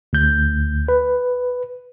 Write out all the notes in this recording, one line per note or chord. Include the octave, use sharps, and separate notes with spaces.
D2 G6
B4